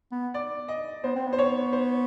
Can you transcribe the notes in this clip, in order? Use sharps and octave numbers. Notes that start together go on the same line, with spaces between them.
B3
D5
D#5
B3 C5
C4
B3
C5
C#5
C5